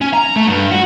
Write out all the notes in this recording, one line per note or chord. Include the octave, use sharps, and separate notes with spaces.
C#4
A#5
A3
G2
F#4